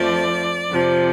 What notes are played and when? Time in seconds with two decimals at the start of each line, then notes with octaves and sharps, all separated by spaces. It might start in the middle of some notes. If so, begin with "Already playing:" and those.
Already playing: F2 F3 A3 D5
0.68 F2 C3 F3